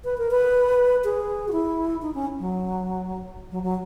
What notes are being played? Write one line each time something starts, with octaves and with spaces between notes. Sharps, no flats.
B4
A#4
B4
G#4
F#4
E4
D#4
C#4
F#3
F#3
F#3